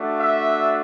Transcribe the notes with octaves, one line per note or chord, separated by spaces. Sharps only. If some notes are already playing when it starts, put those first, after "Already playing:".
Already playing: A3 D4 F#4
E5